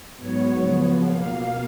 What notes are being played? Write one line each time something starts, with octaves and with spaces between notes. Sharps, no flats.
G#2 F#3 B3 C#5
C#3 F3 B3
B2 A#3 F5